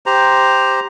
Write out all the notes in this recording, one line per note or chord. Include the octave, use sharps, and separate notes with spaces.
G4 C5 A#5